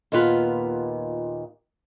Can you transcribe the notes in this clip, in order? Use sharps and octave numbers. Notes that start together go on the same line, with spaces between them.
D#2 A#2 B3 F4 B4